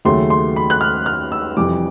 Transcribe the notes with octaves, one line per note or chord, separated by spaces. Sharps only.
D#2 C#3 F#3 A3 C6
C6
B5
F#6
F6
F6
E6
F1 F2 C3 E3 G3 D6